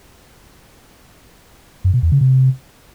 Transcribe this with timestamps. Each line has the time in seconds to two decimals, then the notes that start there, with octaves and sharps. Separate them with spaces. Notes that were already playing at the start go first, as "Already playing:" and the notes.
1.84 F#2
1.94 B2
2.03 E2
2.12 C#3
2.21 C3